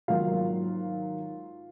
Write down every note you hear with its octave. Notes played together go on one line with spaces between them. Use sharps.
G#2 D#3 F#3 A#3 F4 F5